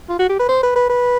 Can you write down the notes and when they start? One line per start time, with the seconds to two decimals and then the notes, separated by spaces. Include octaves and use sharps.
0.09 F4
0.19 F#4
0.29 G4
0.40 B4
0.49 C5
0.63 B4
0.76 B4
0.89 B4